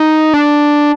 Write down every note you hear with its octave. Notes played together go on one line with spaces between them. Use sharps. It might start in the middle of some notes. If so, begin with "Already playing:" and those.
Already playing: D#4
D4